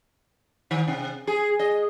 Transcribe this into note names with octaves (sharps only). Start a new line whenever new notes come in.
D#3
C3
G#4
D#5